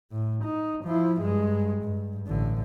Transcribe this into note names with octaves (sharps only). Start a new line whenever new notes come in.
A2
D#4
F3 E4
G2 G#3
G2
A1 D3